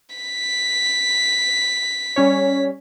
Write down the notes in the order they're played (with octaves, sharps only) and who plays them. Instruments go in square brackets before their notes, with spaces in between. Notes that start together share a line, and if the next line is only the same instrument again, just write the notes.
[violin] B6
[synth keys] G3 C#4 C#5